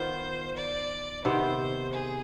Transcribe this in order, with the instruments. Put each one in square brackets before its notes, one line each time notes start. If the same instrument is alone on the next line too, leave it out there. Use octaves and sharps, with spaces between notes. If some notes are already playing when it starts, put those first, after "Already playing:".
Already playing: [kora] D#3 B3 F4 [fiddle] C5
[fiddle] D5
[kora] C3 D#3 B3 [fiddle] C5
[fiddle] G#4